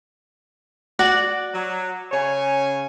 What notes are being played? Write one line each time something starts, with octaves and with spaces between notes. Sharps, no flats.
F#4 D5 F#5
F#3
C#3 C#5 G#5